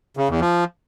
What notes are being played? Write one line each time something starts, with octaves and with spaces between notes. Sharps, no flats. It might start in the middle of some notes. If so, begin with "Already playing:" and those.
C#3
E2
F3